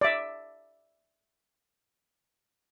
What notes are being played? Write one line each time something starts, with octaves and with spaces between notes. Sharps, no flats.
D5 E5